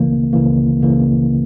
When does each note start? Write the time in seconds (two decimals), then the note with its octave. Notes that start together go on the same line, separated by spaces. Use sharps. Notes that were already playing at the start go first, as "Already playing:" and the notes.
Already playing: C#2 C#3 E3 A#3
0.33 C#2 C#3 E3 A#3
0.83 C#2 C#3 E3 A#3